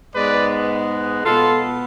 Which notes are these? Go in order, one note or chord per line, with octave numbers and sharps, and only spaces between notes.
G#2 G#3 B3 B4 D5
B2 B3 F4 A4